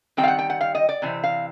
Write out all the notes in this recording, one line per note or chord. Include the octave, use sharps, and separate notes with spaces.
D#3 G3 C4 G5
F5
F#5
G5
F#5
F5
D#5
D5
C3 E3 C4
F5